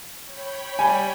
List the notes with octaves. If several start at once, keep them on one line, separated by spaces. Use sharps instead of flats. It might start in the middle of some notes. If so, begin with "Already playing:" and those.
C#5 G5 B5
G3 G#5